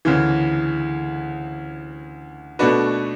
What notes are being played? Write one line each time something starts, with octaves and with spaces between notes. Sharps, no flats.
D2 C#3 E3
B2 A3 D4 F#4 B4